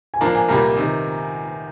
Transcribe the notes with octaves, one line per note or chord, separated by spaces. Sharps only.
G#5
F3 A#3 D4 A#5
G#5
C2 A#2 G3 A#3 A#5
C3 D#3